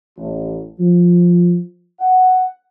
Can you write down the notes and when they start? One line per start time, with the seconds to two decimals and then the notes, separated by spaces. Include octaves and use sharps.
0.18 A1
0.79 F3
2.00 F#5